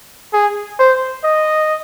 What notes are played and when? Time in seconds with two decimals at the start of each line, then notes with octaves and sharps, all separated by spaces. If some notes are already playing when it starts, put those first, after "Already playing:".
0.33 G#4
0.79 C5
1.24 D#5